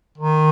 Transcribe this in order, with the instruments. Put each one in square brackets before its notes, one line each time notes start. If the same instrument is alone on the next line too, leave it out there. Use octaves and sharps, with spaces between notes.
[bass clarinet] D#3